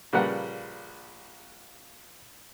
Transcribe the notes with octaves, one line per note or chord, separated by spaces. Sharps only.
A#1 C#3 G3 A#4 B4 F#5